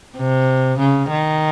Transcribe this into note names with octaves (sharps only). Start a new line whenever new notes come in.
C3
C#3
D#3